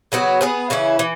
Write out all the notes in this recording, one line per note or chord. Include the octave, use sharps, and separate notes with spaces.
C#3 F#3 B3 F#4
B3 G#4 B4
C#3 E3 C#4 E4
E3